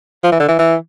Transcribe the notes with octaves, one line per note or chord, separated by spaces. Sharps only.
F3
E3
D3
E3
E3